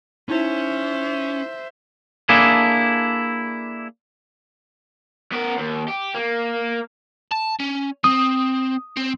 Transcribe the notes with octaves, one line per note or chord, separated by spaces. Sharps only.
C#4 D#4 E4 C5 E5
A#3 D4 E4 G#4 A4
B3 A#4
D#2
G4
A#3
A5
C#4
C4 D#6
C4